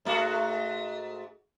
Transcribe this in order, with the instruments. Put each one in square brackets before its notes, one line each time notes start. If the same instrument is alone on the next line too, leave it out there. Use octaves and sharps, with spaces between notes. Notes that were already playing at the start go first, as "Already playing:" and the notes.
[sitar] G#2 A3 F#4